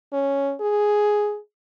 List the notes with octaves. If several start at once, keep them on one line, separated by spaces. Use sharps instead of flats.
C#4
G#4